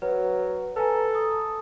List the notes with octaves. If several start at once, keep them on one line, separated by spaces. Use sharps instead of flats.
F#3 B4
A4 B4 G#5 A#5
D#6